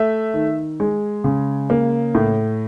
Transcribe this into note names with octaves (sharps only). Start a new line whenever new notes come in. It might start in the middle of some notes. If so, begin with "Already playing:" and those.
Already playing: A3 E5
D#3
G#3
C#3
A#3
A2